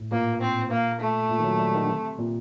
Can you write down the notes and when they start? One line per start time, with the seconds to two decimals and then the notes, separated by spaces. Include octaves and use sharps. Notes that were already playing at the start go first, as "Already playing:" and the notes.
Already playing: A2
0.12 A#2 A#3
0.41 C4
0.71 A#3
1.00 A3
1.29 A#2
1.39 D#3
1.44 F#3
1.59 G3
1.75 D#3
1.83 D3
1.89 C3
2.18 A#2